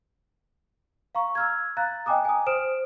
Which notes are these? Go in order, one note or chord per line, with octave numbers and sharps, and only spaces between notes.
F5 A#5 C#6
E6 F6 G#6
F5 A#5 F#6 A6
D#5 G5 G#5 A#5 D6 D#6
G#5 D#6
C5 D#6 F6 D7 E7